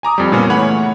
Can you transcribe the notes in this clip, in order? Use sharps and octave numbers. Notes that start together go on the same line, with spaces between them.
G#5 A#5 D6 D#6
F2 G3
A#2 C#3 A#3 B3 C#4
E3 A3 C#5 F#5 B5